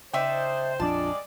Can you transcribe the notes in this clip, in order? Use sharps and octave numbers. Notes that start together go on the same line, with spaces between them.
C#3 D4 D#4 C5 E5 G5
A#1 F2 G3 G#3 D4 F4 D5 A5